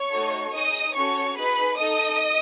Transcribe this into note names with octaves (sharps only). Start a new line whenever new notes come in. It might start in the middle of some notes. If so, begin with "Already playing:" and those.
Already playing: C#5 C#6
A3 D#4 F#4 A4
D#4 G#4 D#5 D#6
C#4 F#4 A4 C#5 C#6
D#4 G#4 B4 B5
D#4 A4 D#5 D#6